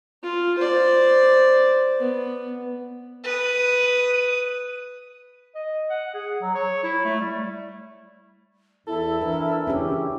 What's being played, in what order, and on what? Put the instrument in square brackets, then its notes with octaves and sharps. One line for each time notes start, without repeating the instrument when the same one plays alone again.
[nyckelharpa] F4
C5 D5
B3
[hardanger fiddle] B4 D#6
[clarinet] D#5
F#5
G#4
F#3
C#5
E4
A3
G3
[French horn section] E2 [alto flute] E4 [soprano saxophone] A4
[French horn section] E3 D4 [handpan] A#4
[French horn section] E3 G#4 [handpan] C#4 D4 G4